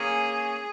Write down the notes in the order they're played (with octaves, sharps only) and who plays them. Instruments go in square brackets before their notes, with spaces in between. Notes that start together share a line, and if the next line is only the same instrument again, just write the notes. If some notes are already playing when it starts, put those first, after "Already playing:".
Already playing: [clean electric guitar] A#3 C#4 [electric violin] G#4